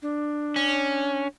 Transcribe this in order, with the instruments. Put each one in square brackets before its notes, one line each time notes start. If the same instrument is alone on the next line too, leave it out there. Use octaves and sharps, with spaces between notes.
[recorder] D4
[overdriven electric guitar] C#4